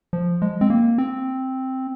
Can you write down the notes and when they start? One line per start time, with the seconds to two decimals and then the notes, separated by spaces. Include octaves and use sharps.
0.13 F3
0.42 G#3
0.61 C4
0.70 A#3
0.98 C4